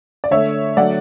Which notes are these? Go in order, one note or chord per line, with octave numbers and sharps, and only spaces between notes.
D5
D3 A3 C#5 E5
D3 F#3 A3 D5 F#5